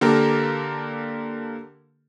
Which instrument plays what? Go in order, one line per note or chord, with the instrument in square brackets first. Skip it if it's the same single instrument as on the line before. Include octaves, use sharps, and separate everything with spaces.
[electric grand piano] D3 A#3 G4 A4 A#4